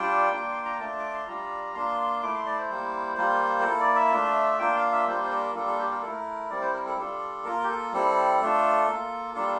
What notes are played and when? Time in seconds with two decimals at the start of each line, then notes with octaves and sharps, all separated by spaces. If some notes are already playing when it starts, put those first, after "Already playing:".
Already playing: G3 D4 F4 G5
0.32 A#3 D4 F4
0.51 C6
0.65 A#5
0.79 A3 D4 F4 A5
0.99 D6
1.14 C6
1.27 G3 D4 F4 A#5
1.75 A#3 D4 F4 C6
2.23 A3 E4 D6
2.35 C6
2.46 D5
2.58 C5
2.70 G3 A#3 E4
3.17 G3 A#3 F4
3.61 A#4
3.64 A#3 E4 A4
3.80 D5
3.96 E5
4.12 A3 D4 F4
4.59 A#3 D4 F4 G5
4.76 F5
4.92 E5
5.07 G3 A#3 D4 F4 C5
5.23 C5
5.31 A#4
5.55 G3 A#3 D4 F4 A4
5.66 A4
5.79 G4
5.91 A#4
6.01 E4 A4
6.07 A3 A#4
6.50 G3 C4 E4 D5
6.61 C5
6.73 A#4
6.86 A4
6.97 G3 D4 F4 A4
7.45 A#3 F4 A#4
7.64 G4
7.68 A4
7.93 G3 C4 E4 A4
8.40 A3 D4 F4
8.88 A#3 F4
9.34 G3 A#3 D4 F4 A4